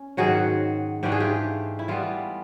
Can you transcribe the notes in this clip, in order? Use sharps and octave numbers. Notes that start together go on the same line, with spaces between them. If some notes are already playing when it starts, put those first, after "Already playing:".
Already playing: C#4
G#2 D#3 F#3 F#4 G#4
G#2 E3 A3 D4 G4
G#4
F4 G4
E4
E3 G3 B3 F4